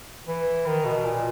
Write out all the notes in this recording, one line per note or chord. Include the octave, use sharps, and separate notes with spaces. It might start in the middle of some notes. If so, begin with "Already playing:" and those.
E3
D#3
B2
A#2